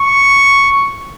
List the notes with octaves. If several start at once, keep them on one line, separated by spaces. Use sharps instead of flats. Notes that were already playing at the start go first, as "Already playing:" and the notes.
Already playing: C#6